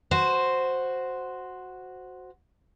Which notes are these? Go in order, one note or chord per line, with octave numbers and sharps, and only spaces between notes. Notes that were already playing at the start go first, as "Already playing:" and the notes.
F#4 C5